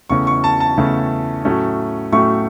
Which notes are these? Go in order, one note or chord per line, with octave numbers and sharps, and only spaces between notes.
E2 C#3 A3 C#4 C#6
C#6
A5
A5
E2 C#3 A3 C#4
A2 F#3 A3 C#4
A2 F#3 A3 C#4 C#6